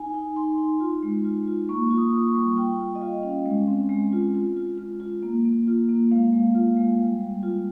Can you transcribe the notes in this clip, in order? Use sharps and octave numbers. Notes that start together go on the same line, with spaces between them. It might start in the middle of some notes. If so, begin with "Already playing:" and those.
Already playing: D#4 G#5
D#4
D#4 C6
D#4
F4
G#3
F4
F4
A#3 C#6
F4
D#6
F4
C#6
G3
F4 G5
F4
D#5
F4 F5
C#4
G#3
C4
G#3
F4
F4
F4
F4
F4
A#3
A#3
F4
A#3
G#3 F5
G#3
F4
G#3
G3
G3
F4